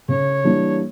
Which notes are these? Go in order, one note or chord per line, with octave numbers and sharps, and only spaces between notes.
C#3 C#5
E3 G3 A#3 D4